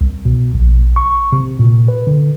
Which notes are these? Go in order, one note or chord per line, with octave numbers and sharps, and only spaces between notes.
C2
B2
A#1
C#6
C3
A#2
B4
D3